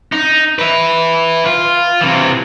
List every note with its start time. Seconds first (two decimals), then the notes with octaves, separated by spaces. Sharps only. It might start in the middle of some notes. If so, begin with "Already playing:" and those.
0.12 D#4
0.59 B4 E5
1.46 F4
2.01 C3 E3